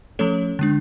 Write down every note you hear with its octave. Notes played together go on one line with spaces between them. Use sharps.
F3 A3 C#4 A4 C#5
D3 G#3 D4